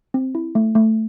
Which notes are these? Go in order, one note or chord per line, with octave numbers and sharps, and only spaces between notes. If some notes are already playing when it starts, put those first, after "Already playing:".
C4
E4
A3
A3